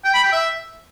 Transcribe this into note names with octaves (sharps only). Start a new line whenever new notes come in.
G5
B5
G5
E5